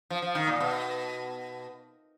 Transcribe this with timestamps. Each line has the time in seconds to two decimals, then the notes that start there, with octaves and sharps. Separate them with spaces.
0.10 F3
0.22 F3
0.35 D#3
0.47 A#2
0.60 B2